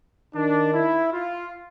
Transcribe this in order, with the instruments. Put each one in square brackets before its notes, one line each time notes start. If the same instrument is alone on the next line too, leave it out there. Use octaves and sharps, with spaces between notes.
[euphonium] D#3 [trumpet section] D4
[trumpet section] E4
F4